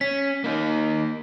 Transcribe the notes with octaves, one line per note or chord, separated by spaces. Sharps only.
C#4 B6
A#3 D#4